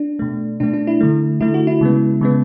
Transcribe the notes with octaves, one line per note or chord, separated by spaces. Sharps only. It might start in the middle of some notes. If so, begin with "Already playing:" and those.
Already playing: D4
B2 A3
B2 A3 D4
D4
E4
D3 A3
D3 A3 E4
F#4
E4
C#3 G#3 B3
C#3 G#3 B3